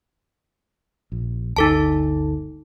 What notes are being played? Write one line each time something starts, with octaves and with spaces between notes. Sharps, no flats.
A#1
G1 D2 D#4 A4 A5